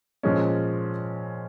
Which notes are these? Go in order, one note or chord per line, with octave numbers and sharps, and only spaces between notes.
A#2 F3 G#3 C#4